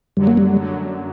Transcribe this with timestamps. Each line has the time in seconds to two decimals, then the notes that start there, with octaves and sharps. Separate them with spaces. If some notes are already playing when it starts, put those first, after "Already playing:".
0.17 F#2 D3 F#3 G3
0.27 A#3
0.37 G3
0.60 F#2 D3 F#3